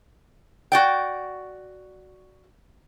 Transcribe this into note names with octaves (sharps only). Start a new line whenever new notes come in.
F#4 D5 G5